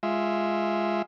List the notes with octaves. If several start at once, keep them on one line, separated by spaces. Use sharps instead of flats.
G#3 F4 E5